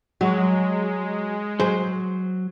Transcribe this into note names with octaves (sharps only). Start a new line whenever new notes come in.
F#3 G#3 F#4
F#3 G#4 C5